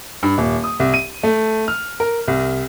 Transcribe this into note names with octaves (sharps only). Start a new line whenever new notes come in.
G2
D#1
D#6
C2
D#7
A3
F6
A#4
C2